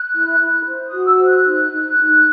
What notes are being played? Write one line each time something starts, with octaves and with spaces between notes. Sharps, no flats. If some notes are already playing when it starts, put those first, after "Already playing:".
Already playing: F#6
E4
E4
C5
D#6
F#4
E6
C5 E6
F#6
D#4
D#4
D#4